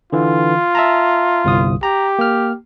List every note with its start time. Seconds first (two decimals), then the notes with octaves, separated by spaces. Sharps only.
0.13 D3 E3 F4
0.75 E5 A5 A#5
1.45 G1 C2 D#6
1.83 G4 A#5
2.19 A#3 F6